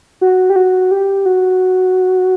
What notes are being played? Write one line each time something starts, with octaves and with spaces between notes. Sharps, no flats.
F#4
G4
F#4
G4
F#4